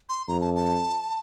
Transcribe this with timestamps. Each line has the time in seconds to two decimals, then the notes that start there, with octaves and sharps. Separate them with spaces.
0.09 C6
0.28 F2 A#5
0.41 A5
0.55 A5